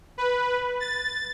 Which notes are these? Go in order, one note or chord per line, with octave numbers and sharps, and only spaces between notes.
B4
A6